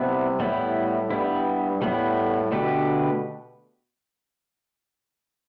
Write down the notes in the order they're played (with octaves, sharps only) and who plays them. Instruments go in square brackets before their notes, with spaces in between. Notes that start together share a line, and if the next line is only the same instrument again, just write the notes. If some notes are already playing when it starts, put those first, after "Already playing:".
Already playing: [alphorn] C3 [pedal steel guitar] G3 B3 E4
[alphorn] A2 [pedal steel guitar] G3 B3 E4
[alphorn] G2 [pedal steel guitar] G3 B3 E4
[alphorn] A2 [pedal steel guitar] G3 B3 E4
[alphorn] B2 [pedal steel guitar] D3 A3 D4 G4 B4